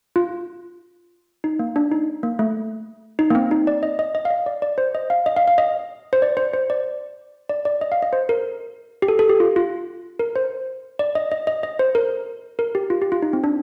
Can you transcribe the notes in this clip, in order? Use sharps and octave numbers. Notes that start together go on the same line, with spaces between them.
F4
D#4
A#3
D4
D#4
A#3
A3
D#4
A#3
C4
D#4
D5
D#5
D#5
D#5
F5
D#5
D5
D5
C5
D#5
F5
D#5
F5
F5
D#5
C5
D5
C5
C5
D5
D5
D5
D#5
F5
D#5
C5
A#4
G4
A4
A4
G4
F4
F4
A#4
C5
D5
D#5
D#5
D#5
D#5
C5
A#4
A#4
G4
F4
G4
F4
D#4
C4
D4